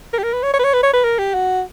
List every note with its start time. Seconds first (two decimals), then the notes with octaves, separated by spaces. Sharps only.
0.13 A#4
0.19 G4
0.23 A#4
0.33 B4
0.43 C#5
0.53 C#5
0.59 B4
0.64 C#5
0.73 B4
0.83 C#5
0.93 B4
1.04 A#4
1.19 G4
1.34 F#4